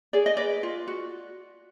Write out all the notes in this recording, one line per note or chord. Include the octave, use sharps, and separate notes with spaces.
G#4 D5
D#5
B4 D5
F4
F#4